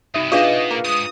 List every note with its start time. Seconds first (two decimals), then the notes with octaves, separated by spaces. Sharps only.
0.14 G2 C3 D#4 E5 D#6
0.32 B2 D4 F4 G#4 B4 D#5 F5
0.71 A#3
0.85 D#2 G#2 D#6